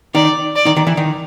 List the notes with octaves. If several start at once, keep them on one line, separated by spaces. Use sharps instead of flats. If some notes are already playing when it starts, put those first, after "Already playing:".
D#3 D#4 D5
D5
D#3 D#4
D#3 D#4
E3 E4
D#3 D#4